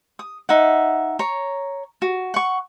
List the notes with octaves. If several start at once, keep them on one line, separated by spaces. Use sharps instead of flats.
D#6
D#4 E5 F#5
C#5 A#5
F#4
F#5 C#6